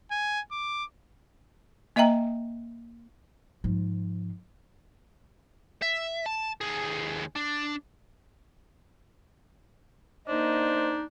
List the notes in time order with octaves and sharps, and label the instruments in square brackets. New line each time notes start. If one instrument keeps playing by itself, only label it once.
[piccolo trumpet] G#5
D6
[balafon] A#3 D#5 E5 G5 A#5
[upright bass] G#2 F3
[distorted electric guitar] E5
A5
D#2 G#4
D4
[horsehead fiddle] A#3 D#5 [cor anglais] D4 [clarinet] D#4 [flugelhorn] C5